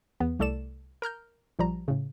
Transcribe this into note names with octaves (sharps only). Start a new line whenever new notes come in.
E2 B3
C2 A3 A4 D5 E7
A#4 A#5 F6 G6
A#1 F3 G3 A#5
A2 C#3